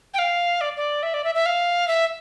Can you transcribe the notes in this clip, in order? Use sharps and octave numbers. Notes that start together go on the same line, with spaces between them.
G5
F5
D5
D5
E5
D5
E5
E5
F5
E5